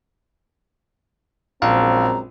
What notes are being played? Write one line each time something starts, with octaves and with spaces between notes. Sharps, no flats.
A#1 F#2 G#3 C4 F5 A#5